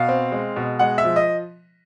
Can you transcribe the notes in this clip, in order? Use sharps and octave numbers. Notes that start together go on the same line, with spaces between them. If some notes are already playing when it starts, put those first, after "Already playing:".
Already playing: B2 F5
C4
G#3
B2
G#3 F#5
E5
F3
D#5